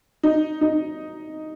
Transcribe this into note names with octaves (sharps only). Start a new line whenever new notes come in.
D#4
D#4